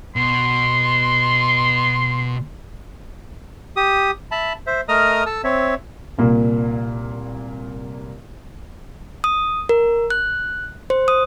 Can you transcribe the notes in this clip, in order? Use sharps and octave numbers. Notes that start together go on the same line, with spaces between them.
B2 C6
G4 D#6
E5 A5 B5
C5 E5
A3 A#4 D#5 A#5 D#6 F6
A4 A5 E6
C4 C#5 E5
C2 A#2 A#3
D#6
A#4
F#6
C5
D#6